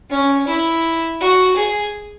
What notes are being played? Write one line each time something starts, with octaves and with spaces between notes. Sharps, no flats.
C#4
E4
F#4
G#4